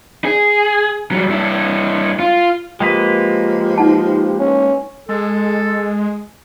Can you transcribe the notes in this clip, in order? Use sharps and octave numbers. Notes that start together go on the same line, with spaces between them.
G#4
F#3 G3
G2 E4
F4
F3 G#3 A#3 G4 B4 G5
D#4 F#5 A5
C#4
G#3 A4